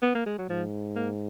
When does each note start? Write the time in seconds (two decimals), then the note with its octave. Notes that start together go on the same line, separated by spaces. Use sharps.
0.02 B3
0.15 A#3
0.26 G#3
0.38 F#3
0.49 G#2 F3
0.96 A#3